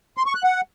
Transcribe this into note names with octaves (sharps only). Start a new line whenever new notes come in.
C6
C#6
F#6
F#5